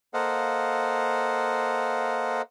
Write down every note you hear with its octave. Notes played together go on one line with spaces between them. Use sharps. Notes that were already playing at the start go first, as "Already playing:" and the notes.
A#3 A4 C5 D#5 F5 F#5